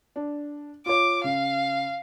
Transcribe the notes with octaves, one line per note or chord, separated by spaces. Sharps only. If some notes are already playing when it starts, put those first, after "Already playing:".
D4
F4 C#5 D6
C#3 F5